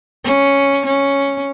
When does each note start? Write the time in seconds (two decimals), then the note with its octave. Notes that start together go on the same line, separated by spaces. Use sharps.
0.24 C#4
0.86 C#4